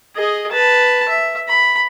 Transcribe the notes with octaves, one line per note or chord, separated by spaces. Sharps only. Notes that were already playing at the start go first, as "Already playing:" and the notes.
G#4 D#5
B4 A5
E5
B5